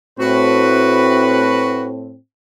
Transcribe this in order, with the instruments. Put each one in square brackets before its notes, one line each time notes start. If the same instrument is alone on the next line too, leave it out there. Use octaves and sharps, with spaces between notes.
[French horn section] A2 C4 [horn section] F#4 B4